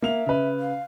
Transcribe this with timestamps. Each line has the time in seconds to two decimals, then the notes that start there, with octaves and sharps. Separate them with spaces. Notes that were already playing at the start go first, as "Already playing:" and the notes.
0.02 A#3 E5 F7
0.26 C#3 B4
0.59 F5